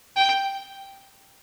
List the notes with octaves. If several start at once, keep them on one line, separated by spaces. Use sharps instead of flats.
G5